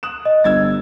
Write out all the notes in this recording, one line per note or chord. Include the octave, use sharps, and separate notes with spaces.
D#6 F#6 E7
D#5
G1 E6 G#6 A6